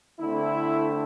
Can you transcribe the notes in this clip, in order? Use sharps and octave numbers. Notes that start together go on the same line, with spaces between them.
D3 A3 C4 E4